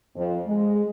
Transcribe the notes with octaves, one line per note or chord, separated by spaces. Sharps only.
F2
G#3